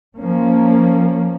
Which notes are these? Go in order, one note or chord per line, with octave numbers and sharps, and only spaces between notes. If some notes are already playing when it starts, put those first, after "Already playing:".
F3 A#3 C#4